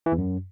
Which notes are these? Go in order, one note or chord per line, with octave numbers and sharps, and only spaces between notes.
E3
E2
F#2